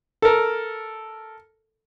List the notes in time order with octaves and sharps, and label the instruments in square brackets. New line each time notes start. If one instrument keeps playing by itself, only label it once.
[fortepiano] A4 A#4